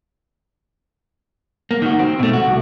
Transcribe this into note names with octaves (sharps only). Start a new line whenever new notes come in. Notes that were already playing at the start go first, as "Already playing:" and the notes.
A#3
D#3 F#4
C4
B2 A3
F#4
C2